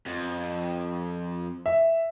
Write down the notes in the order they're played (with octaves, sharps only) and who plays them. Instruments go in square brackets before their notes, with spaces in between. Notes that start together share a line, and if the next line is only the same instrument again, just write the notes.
[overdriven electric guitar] F2
[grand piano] E5